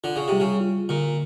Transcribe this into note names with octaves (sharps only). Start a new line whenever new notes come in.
D3 F4
C#3
C3 G3
C#3
F4
A#2 D3